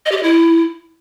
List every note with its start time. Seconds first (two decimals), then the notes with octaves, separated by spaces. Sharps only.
0.06 D#5
0.12 G4
0.17 D#5
0.23 E4